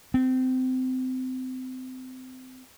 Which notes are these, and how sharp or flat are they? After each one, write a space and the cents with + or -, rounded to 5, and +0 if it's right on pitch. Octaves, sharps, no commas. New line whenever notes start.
C4 -25